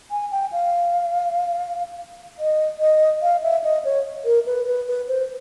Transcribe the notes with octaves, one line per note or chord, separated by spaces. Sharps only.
G#5
G5
F5
D#5
D#5
F5
E5
D#5
C#5
A#4
B4
B4
B4
C5